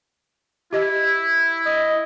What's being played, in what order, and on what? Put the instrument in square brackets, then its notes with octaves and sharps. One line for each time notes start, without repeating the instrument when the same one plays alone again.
[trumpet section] E4 [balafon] G4 D#5
[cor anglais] D#5